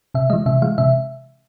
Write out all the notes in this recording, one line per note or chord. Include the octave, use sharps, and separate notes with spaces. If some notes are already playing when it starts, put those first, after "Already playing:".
C3 E5
E3 G#3 D#5
C3 E5
E3 G#3 F5
C3 E5